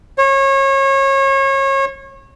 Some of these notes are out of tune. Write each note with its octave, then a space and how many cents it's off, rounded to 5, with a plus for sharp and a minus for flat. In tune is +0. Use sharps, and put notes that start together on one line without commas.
C#5 -30